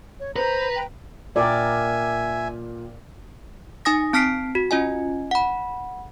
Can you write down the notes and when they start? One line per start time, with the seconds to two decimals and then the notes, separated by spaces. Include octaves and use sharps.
0.20 C#5
0.36 B4 C5 A#5
0.75 G5
1.36 A#2 A#4 D5 E5 G5 G#5
3.85 D#4 G#5 D#6 A#6
4.13 C4 A5 F6 B6 C7 D7
4.55 F#4
4.71 C#4 F4 D#5 G#5
5.31 F#5 B5